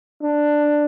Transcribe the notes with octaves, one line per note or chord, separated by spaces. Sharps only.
D4